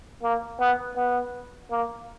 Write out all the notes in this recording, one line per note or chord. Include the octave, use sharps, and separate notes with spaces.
A#3
B3
B3
A#3